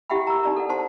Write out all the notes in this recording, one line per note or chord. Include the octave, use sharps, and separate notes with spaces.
E4 G4 E5 F#5 G5 B5
A#4 A#5
D#4 D5 A#5
A4 D5 F#5
C5 F#5 A5 C6